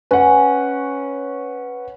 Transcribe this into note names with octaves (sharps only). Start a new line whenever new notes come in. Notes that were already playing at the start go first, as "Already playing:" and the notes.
C#4 B4 F#5